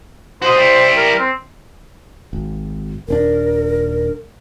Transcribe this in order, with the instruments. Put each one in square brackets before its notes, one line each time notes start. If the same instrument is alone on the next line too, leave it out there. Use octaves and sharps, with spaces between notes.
[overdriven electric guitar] F#4 D#5 [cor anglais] C5
[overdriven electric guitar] G3 E4
[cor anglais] A#4
C4
[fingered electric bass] G#1
[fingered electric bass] D#1 C4 D4 [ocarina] A#4